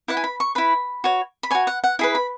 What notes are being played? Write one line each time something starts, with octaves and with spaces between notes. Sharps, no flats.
E4 B4 F#5
G#5
B5
C#6
E4 B4 B5
F#4 C#5
B5
F#4 C#5 G#5
F#5
F#5
E4 G#4 B4 B5
B5